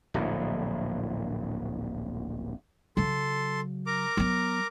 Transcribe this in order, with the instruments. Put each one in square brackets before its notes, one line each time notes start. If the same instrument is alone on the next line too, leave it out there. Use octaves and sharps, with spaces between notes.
[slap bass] D1 A#1 A2
[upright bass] C#3 F#3 [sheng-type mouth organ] A4 C6
[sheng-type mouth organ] A#4 A#5 D6
[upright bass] F#3 B3